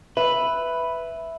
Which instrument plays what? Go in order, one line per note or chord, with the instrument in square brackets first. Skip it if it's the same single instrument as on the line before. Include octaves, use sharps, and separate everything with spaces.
[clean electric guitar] B4 [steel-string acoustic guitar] E5